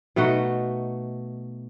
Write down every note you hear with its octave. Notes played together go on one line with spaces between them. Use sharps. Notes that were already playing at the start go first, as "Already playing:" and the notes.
B2 A3 D#4 F#4